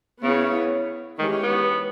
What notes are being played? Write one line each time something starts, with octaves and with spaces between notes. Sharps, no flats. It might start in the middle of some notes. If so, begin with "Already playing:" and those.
C#3 B3 E4 G#4 C#5
D#3 E3 G#3 C#4 G4 C#5
B3